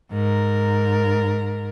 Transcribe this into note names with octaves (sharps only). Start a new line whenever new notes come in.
G#2 A#4